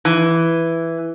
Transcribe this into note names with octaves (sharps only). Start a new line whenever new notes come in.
E3